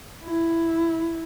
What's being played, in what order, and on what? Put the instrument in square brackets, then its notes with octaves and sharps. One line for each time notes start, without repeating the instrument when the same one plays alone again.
[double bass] E4